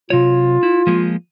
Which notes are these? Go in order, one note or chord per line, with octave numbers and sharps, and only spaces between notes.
C3 F#3 F4 C#5
E4
F3 G#3 A#3